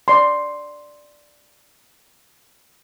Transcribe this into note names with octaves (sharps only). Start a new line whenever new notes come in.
D5 C6